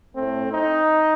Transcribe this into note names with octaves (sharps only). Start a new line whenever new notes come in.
A2 A3 C4
D#4